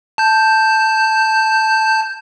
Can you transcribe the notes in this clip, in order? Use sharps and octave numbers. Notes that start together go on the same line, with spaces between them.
A5 G6